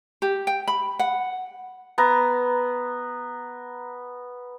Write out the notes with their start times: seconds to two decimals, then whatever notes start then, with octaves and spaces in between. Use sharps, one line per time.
0.22 G4
0.47 G5
0.68 B5
0.99 F#5
1.98 B3 A#5